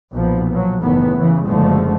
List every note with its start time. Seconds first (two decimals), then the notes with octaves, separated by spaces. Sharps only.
0.13 B1 A#2 F3 B3
0.51 F3 F#3
0.82 F#1 A2 D#3 E3 B3
1.17 C#3 E3
1.47 F#1 D3 F3 G#3 A3